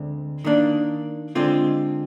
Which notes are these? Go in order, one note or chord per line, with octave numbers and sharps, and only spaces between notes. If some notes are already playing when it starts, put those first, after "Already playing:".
Already playing: D2 D3 G#3 C4
D#3 A#3 D4
D3 G#3 C4 F4